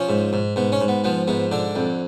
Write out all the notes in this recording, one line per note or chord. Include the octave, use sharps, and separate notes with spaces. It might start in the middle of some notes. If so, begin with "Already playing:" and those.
Already playing: F3 C#4
G#2
G#2
G#2 B3
C#4
G#2
B3
F3 B3
G#2 B3
D3 D4
F2